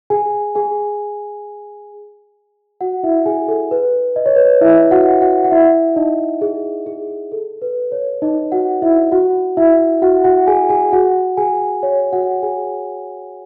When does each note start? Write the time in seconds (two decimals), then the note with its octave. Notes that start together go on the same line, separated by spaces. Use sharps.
0.10 G#4 G#5
0.55 G#4 G#5
2.81 F#4 F#5
3.03 E4 E5
3.26 G#4 G#5
3.48 A4
3.71 B4
4.16 D#5
4.26 C#5
4.36 B4
4.45 C#5
4.61 E4 E5
4.91 F#4 F#5
5.21 F#4 F#5
5.44 F#5
5.51 E4 E5
5.96 D#4 D#5
6.41 G#4
6.86 G#4
7.32 A4
7.62 B4
7.92 C#5
8.22 D#4 D#5
8.52 F#4 F#5
8.82 E4 E5
9.12 F#4 F#5
9.57 E4 E5
10.02 F#4 F#5
10.24 F#4 F#5
10.47 G#4 G#5
10.70 G#4 G#5
10.93 F#4 F#5
11.37 G#4 G#5
11.83 C#5
12.13 F#4 F#5
12.43 G#4 G#5